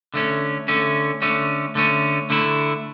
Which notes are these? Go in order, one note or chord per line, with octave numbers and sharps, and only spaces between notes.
D3 A3 C#4
D3 A3 C#4
D3 A3 C#4
D3 A3 C#4
D3 A3 E4